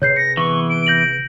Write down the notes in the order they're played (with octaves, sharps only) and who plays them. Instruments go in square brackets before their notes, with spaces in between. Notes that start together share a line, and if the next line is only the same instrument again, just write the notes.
[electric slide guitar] C3 G#4 B4 [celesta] C#5 G6 C7
[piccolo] A#6 [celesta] C#7
[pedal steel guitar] E3 B3 [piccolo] C#6
[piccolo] D7
[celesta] G6 A#6 F#7